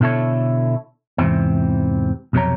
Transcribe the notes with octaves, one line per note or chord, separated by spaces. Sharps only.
B2 D3 E4 A4 C#5
E2 G#2 C3 E3 C4
B1 F2 C3 G4 C#5 A#5